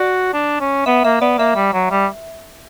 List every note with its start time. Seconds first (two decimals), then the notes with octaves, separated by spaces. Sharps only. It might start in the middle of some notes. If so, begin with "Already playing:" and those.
Already playing: F#4 D5
0.34 D4
0.60 C#4
0.86 B3 E5
1.04 A#3 E5
1.21 B3 D5
1.38 A#3 E5
1.56 G3
1.73 F#3
1.91 G3